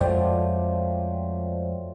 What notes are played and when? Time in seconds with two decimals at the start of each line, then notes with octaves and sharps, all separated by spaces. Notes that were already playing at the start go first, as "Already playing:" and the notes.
0.01 F2 F3 F#3 G#3 A3 C5 D5 G5